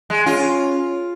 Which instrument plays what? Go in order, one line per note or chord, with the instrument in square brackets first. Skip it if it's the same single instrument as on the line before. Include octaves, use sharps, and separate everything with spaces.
[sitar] G#3
[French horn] C#4 [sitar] F4